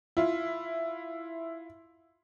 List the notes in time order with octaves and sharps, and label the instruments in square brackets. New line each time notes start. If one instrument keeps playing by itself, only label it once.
[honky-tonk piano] E4 F4